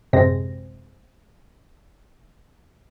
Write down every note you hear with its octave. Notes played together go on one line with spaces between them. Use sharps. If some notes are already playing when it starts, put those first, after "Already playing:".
A1 F#2 C3 G#3 C4 A#6